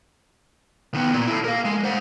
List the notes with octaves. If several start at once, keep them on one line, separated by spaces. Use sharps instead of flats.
D#3 B3
A#2
E4 A4
A#4 F5
G#3
C5 F#5